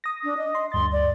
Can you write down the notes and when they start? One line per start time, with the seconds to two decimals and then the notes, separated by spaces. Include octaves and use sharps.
0.04 D#6 A#6
0.24 D4
0.38 D#5
0.55 C6
0.72 D2 G2 C6 A6
0.92 D5